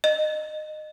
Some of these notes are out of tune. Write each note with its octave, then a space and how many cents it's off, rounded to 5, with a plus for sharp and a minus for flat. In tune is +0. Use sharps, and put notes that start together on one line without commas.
D#5 -20